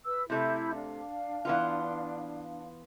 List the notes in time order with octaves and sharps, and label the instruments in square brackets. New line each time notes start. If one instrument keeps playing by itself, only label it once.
[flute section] B4 E6
[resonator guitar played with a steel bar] C3 A3 [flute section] E4 B5 G6
[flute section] D4 F5
[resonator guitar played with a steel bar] E3 B3 F4